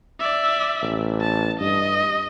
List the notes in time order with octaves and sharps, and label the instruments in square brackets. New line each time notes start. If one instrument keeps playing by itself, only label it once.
[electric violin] D5 E5
[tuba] A1
[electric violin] A5
[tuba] G2 [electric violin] D#5